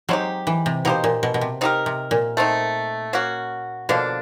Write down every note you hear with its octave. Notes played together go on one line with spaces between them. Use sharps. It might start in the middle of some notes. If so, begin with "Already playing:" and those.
F#3 G#3 C4 D#4 G4
E3
C3
B2 A#3 D#4 G4 C5
A#2
B2
B2
C3
C4 D#4 G4 A#4
C3
A#2
A3 C4 D#4
A#3 C#4 F#4
B2 D3 F3 A#3 D4